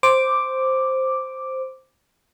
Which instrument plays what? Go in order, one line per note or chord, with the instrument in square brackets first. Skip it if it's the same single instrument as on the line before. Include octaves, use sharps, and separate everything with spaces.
[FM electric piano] C5 D6